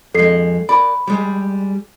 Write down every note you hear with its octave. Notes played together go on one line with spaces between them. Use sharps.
F2 G#3 A4 C7
A#4 D5 B5
G3 G#3